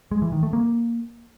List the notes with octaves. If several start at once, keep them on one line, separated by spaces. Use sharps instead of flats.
G#3
E3
D#3
A3
A#3